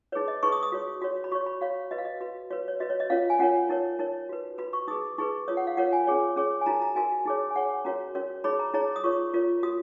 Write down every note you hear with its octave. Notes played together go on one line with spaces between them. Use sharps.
D#4 G#4 B4 C#5
D#5
D#4 G#4 B4 C#6
D#6
D#6
F#4 C#5
F#4 C#5
B5
F#4 C#5 C#6
B5
F#4 C#5 F5
F#4 B4 D#5
F5
D#5
F#4 B4
F#4 B4 C#5
C#5
F#4 B4 D#5
C#5
D#5
C#4 F4 A#4 C#5 F5
G#5
C#4 F4 A#4 C#5 F#5
D#4 A#4 C#5
D#4 A#4 C#5
F#4 B4
F#4 B4 B5
C#6
D#4 G#4 B4 D#6
D#4 G#4 B4 C#6
F4 A#4 C#5 D#6
F#5
F5
F4 A#4 C#5 F#5
G#5
C#4 G#4 C#5
C#4 G#4 C#5
G#5
D#4 F#4 A#4 A#5
A#5
D#4 F#4 A#4 G#5
D#4 G#4 C#5
G#5
D#4 G#4 C#5 F#5
C#4 F#4 A#4 C#5 A#5
C#4 F#4 A#4 C#5
D#4 G#4 C#5 B5
A#5
D#4 G#4 C#5 A#5
D#6
F4 A#4 C#5 C#6
F4 A#4 C#5
F#4 A#4 D#6